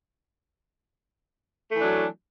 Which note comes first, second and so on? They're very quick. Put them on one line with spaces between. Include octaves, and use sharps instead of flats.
A3 E3 D4 F#3